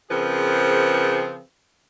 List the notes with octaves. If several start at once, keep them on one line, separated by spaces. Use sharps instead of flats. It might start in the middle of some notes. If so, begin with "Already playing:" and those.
C#3 F3 C4 G#4 A#4 B4